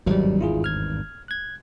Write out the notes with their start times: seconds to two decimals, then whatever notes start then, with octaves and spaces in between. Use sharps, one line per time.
0.06 G#1 E2 G2 F#3 G3
0.41 E4 F4 G#4
0.64 F6 G#6
1.28 F#6 G#6